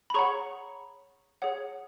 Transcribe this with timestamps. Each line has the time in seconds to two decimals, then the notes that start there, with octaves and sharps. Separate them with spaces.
0.10 B5
0.14 G#4 C#5 F#5 A#5 C#6
1.42 G#4 C#5 F#5